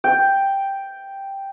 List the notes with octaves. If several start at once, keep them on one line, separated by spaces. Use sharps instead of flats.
G5